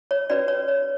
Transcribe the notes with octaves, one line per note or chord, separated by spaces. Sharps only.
C#5
C#4 F#4 B4 D5
C#5
C#5